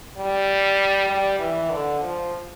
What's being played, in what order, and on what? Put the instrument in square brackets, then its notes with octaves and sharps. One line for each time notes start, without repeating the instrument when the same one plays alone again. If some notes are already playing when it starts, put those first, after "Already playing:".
[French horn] G3
G3
E3
D3
F3